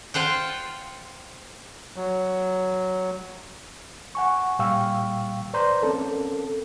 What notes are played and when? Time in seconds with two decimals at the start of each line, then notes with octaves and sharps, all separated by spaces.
0.14 F4 C5 F#5 G5
1.96 F#3
4.15 F#5 G#5 C#6
4.59 A#2 G3 F5 G5 C#6 E6
5.54 B4 C5 D5 A#5 C6 G6
5.82 C4 C#4 A4 A#4